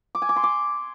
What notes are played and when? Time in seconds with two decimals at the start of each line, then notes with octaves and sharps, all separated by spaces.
0.15 D6
0.22 G#5
0.29 D6
0.36 C6
0.44 D6